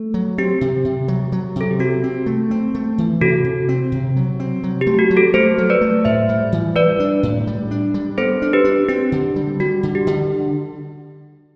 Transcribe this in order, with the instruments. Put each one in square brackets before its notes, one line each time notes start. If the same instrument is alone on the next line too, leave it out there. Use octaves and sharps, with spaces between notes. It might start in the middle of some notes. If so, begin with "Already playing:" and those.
Already playing: [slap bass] A3
F#3
[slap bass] C4 [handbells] G4
[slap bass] C3
C3
F#3
F#3
[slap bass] C3 [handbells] A4
[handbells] G4
[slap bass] C4 [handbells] F#4
[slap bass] C4
A3
C4
A3
E3
[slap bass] C3 [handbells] F#4 A4
[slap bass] C3
C4
C3
F#3
C4
F#3
[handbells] G4
[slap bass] A3
[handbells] F#4
[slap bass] F#3
[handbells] F#4 A4
[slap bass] A3 [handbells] A4 C5
[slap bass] F#3
[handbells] B4 D5
[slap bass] A3
[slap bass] A2 [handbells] C5 E5
[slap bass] G3
E3
[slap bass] G3 [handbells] B4 D5
[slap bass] D4
A2
G3
D4
G3
[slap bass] B3 [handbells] A4 C5
[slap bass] D4
[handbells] G4 B4
[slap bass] D4
[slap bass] C4 [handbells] G4
[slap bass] D3
G3
[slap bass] G3 [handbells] F#4
[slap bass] D3
[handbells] G4
[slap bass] D3